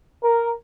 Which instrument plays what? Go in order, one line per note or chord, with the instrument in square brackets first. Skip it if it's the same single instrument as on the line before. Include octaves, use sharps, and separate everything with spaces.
[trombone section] A#4